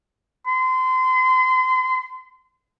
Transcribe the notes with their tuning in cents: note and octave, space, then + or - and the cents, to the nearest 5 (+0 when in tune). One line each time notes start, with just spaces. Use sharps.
C6 -30